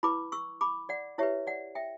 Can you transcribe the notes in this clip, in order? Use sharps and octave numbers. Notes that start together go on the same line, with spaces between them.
E4 B4 B5 D6
C#6 E6
B5 D6
D5 F#5
E4 G4 B4 C#5 E5
D5 F#5
E5 G5